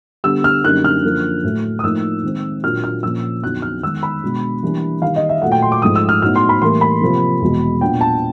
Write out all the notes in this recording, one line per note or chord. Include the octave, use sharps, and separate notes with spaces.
D3 G3 B3 E6
F6
F#2 D3 G3 A#3 D#4 F#6
F6
F#2 D3 F3 A#3
A2 F#3 A3
D#6
A2 F3 A#3 D#4 E6
D#3 G#3 C4
A#2 F#3 A#3 D4 F4 F6
F6
A#2 F3 A#3 C#4 E6
F2 D3 F#3 B3 D#4 F#6
F6
D#3 G#3 B3 E6
B5
B2 G#3 B3 D4
E3 G3 A#3 D4
D#3 G3 A#3 D#4 F5
D#5
E5
A#2 F#3 A3 F#5
G5
C6
D6
G#2 F3 A3 D#6
E6
F6
A2 F#3 B3 D#4 F6
C6
B5
A2 E3 G3 A#3 C6
B5
C3 F3 A#3
E2 B2 G#3
A#2 F#3 B3 D4 G5
A5